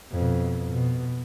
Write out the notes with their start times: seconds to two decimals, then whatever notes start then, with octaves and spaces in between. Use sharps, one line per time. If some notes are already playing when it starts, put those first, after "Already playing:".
0.12 F2 B2
0.71 B2